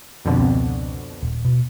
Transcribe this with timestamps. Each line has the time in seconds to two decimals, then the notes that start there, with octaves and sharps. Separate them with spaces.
0.25 F2 B2 D3
0.38 C#2 C4
1.23 D#1
1.45 B2